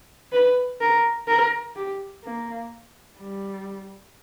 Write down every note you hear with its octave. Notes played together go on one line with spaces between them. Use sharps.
B4
A#4
A#4
G4
A#3
G3